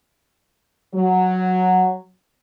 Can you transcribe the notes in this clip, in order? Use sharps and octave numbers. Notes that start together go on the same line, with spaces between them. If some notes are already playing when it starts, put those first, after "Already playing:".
F#3